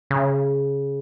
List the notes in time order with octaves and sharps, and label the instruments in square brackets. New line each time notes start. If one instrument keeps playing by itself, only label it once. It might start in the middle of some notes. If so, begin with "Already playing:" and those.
[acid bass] C#3